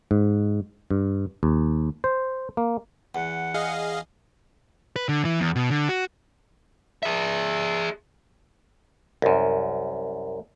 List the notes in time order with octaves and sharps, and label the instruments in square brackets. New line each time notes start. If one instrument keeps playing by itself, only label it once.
[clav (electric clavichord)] G#2
G2
D#2
C5
A#3
[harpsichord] E2 [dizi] F#5
[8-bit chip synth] G#4 D#5 F5
[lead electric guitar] B4
D3
E3
E2
B2
D3
F#4
G#4 E5
[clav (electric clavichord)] C2 F#2